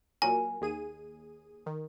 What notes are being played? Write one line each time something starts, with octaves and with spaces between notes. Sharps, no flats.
A#2 F#3 A#4 G#5
D#2 G#4 D#7
D#3